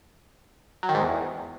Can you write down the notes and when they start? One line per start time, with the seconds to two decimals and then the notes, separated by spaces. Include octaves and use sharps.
0.83 F#3
0.89 D#3
0.95 G#2
1.01 E2